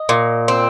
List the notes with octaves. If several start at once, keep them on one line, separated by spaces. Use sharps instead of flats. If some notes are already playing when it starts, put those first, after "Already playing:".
Already playing: D#5
A#2
C4